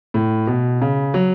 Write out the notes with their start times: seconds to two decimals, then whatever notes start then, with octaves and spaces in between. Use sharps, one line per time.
0.14 A2
0.47 B2
0.82 C#3
1.14 F#3